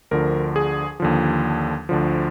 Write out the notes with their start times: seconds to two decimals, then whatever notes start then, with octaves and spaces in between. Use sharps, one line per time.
0.11 D2 D3 F3 A#4
0.56 G#4
1.00 D#2 D3 F3
1.89 D2 D3 F3